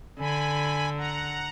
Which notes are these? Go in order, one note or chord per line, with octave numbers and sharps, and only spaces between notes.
D3 G#5 B5
F#5 A#5